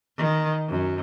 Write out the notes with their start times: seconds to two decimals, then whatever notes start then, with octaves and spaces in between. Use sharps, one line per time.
0.17 D#3
0.69 F#2